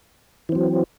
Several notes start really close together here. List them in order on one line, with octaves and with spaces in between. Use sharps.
E3 C4 F#3